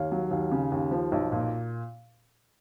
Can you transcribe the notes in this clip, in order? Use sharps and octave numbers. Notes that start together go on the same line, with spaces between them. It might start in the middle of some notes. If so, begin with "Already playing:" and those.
Already playing: D#2 C#5 F5
F#3
D#2
C#3
D#2
F3
B1
A#2